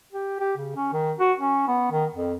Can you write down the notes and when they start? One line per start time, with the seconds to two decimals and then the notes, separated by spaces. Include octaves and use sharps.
0.12 G4
0.40 G4
0.57 C#3
0.76 C#4
0.93 D#3
1.19 F#4
1.39 C#4
1.68 B3
1.92 D#3
2.14 F2